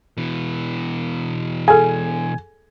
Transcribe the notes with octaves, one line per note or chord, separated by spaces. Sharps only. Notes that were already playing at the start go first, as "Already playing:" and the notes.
B2 E3
G#4 A4 G#5